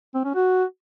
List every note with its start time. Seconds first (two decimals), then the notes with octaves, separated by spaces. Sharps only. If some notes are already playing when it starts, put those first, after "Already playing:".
0.15 C4
0.25 C#4
0.35 F#4